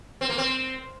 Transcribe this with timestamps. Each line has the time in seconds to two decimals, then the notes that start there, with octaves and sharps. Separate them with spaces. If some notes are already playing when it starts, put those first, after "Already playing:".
0.21 C4
0.29 A#3
0.38 C4